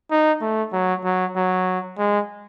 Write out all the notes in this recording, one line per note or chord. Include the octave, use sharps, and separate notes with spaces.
D#4
A3
F#3
F#3
F#3
G#3